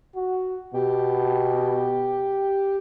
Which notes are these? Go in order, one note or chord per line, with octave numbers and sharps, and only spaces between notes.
F#4
B2 G4